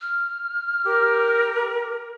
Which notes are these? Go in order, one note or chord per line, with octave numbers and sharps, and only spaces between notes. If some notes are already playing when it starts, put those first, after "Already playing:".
F6
G4 A#4